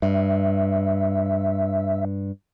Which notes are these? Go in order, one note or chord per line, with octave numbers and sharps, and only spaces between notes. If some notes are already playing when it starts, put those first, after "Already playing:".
G2 E5